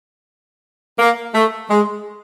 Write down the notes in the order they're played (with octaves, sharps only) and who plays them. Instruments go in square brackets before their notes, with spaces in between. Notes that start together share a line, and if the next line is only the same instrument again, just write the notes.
[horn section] A#3
A3
G#3